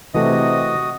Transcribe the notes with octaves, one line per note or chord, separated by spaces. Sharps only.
C3 E3 A3 F#4 D#5 D#6